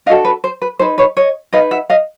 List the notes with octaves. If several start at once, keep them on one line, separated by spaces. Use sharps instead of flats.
D4 F#4 A4 D#5 F5
B4
C5
B4
D#4 G#4 B4 C5
B4 C#5
C#5 D#5
D#4 G#4 B4 D#5 F5
E5 F#5
D#5 F5